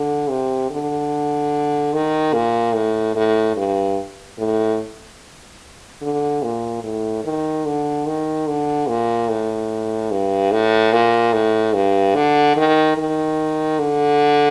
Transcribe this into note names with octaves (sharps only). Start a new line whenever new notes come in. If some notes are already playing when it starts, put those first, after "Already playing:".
Already playing: D3
C3
D3
D#3
A#2
A2
A2
G2
A2
D3
A#2
A2
D#3
D3
D#3
D3
A#2
A2
G2
A2
A#2
A2
G2
D3
D#3
D#3
D3